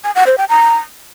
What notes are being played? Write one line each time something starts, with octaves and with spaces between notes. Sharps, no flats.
G#5
F#5
C5
G5
A#5